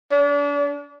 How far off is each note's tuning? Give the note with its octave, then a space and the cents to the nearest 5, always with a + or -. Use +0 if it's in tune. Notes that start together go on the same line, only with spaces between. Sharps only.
D4 -35